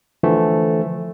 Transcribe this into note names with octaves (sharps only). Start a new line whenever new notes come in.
D3 E3 F3 A3